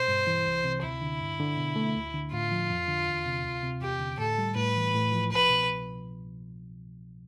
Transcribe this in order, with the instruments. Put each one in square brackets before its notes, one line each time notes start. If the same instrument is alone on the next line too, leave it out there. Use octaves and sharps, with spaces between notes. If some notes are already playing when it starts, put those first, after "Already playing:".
Already playing: [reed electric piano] B2 [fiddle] C5
[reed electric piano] G2
E3
C2
C3
[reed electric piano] D2 [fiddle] E4
[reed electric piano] D3
G2
D3
B2
A3
D2
D3
[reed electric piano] A2 [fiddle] F4
[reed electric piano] F3
F2
D3
E2
C3
D2
C3
[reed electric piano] E2 [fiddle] G4
[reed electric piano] D3
[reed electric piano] A2 [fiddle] A4
[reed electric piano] G3
[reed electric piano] A2 [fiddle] B4
[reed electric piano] E3
A2
F3
[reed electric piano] C2 [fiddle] B4
[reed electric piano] B2